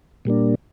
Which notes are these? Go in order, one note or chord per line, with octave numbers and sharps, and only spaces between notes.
A#2 G3 A#3 D4